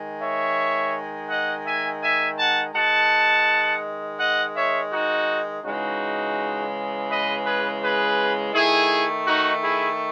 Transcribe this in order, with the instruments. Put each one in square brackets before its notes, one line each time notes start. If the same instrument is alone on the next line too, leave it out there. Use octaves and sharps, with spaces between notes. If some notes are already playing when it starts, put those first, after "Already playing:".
Already playing: [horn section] D#3 G#3
C#5 E5
D#5 F#5
E5 G#5
E5 G#5
F#5 A5
D#3 G#3 F#5 A5
D#5 F#5
C#5 E5
D#4 F#4
C#3 E3 G#3 D#4 F#4
B4 D#5
G#4 B4
G#4 B4
D#3 A3 E4 G#4
D#4 F#4
E4 G#4